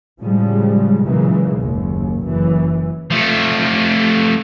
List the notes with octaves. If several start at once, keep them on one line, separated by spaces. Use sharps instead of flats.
A2 C#3 F3 G3 G#3
A#2 C#3 E3 F#3 G#3 A#3
F#1 D#2 A#2
F#1 F#2 E3
F3 A3